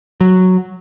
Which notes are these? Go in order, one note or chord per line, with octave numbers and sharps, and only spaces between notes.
F#3